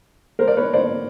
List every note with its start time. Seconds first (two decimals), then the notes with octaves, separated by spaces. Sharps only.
0.39 A#4 C5
0.47 D5
0.57 B4 C#5
0.73 C5 D5